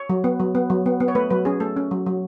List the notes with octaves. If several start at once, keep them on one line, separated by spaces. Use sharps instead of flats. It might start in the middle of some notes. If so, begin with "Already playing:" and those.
Already playing: C#5
F#3
B3
F#3
B3
F#3
B3
B3
C#5
A3 B4
F#3 B4
C#4 G#4
A3 A4
C#4
F#3
F#3